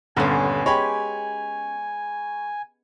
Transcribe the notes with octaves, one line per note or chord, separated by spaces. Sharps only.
D#1 G2 D3 B3 C#4 G#5
G#3 G4 C#5 B5